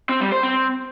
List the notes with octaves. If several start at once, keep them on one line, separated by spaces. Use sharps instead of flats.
C4
G3
C5
C4